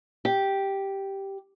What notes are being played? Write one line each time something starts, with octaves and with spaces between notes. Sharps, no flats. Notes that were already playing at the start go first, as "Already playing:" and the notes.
G4